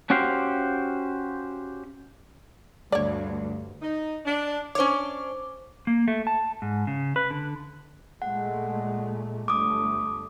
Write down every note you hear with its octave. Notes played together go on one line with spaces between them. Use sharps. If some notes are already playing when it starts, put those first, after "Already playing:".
C#4 F#4 G4 C5 F5
D2 G2 C#5 D5
D#4
D4
C#4 D4 C5 C#5 D6
A#3
A3
A5
G#2
C#3
B4
D3
A#2 G#3 A3 F#5
G1 A3 D6 D#6